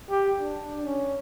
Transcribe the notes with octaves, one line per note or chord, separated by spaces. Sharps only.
G4
D4
C#4